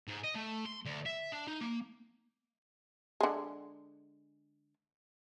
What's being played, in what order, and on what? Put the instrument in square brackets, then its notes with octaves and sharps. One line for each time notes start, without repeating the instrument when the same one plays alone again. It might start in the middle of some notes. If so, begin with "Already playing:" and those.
[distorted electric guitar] G#2
D#5
A3
C6
D2
E5
D4
D#4
A#3
[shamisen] D3 G#3